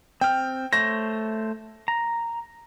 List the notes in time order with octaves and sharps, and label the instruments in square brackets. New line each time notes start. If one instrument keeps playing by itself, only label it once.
[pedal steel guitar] C4 F6 [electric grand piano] G5
[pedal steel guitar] A3 C5 C#5 [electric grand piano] A#6
[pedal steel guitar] A#5